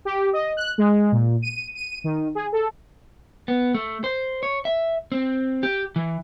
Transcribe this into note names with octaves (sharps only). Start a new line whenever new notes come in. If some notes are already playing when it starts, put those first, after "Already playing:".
G4
D#5
F#6
G#3
A#2
D#7
D#7
D#3
G#4
A4
B3
A3
C5
C#5
E5
C4
G4
E3